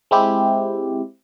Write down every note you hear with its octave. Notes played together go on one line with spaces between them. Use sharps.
G#3 C4 E4 G4